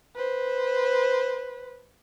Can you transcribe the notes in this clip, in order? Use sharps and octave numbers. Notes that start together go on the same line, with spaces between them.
B4 C5